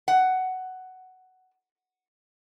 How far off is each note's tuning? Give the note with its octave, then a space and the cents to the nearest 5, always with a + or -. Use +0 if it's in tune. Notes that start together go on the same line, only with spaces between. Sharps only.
F#5 +10